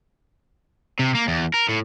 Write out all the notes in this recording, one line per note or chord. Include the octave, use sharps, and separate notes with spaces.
C3
A#3
E2
A#4
A2